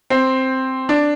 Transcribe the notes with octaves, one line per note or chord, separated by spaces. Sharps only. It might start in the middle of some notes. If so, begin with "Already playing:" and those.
C4
D4